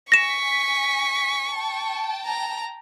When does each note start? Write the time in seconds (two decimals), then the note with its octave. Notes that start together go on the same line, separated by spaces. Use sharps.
0.12 G#5 C#6 A#6 B6 E7
1.53 G5 A5
2.26 A#5